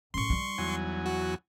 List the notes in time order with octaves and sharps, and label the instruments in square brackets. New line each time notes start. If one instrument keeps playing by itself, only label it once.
[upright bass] F#2 A2 [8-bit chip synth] C6 C#6
[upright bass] G3 D#4
[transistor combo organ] E2 F#3 G#5
[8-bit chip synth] F#4